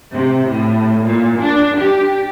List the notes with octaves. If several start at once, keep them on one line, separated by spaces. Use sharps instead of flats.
C3
A2
A#2
D4
G4